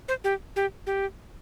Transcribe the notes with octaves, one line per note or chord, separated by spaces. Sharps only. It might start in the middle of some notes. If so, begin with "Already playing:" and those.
C5
G4
G4
G4